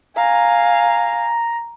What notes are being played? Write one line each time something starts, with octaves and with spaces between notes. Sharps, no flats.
F5 G#5 A#5